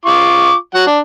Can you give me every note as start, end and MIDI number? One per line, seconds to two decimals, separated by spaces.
0.05 0.54 65
0.05 0.54 85
0.05 0.54 86
0.75 0.84 54
0.75 0.84 78
0.87 1.00 62